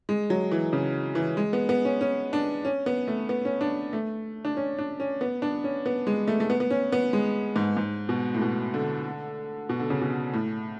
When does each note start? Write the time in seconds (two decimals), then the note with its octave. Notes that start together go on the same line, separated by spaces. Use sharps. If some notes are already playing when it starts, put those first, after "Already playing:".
0.09 G#3
0.30 F#3
0.51 E3
0.73 C#3
1.15 E3
1.37 G#3
1.53 B3
1.69 B3
1.85 C#4
2.01 C#4
2.33 D4
2.65 C#4
2.86 B3
3.07 A3
3.29 B3
3.45 C#4
3.61 D4
3.93 A3
4.45 D4
4.57 C#4
4.79 D4
5.00 C#4
5.21 B3
5.42 D4
5.64 C#4
5.86 B3
6.07 G#3
6.28 A3
6.40 A3
6.50 B3
6.60 B3
6.70 C#4
6.92 B3
7.13 G#3
7.56 G#2
7.77 G#2
8.09 B2
8.35 A2
8.41 B2
8.74 D3
9.69 B2
9.79 D3
9.90 C#3
10.01 B2
10.34 A2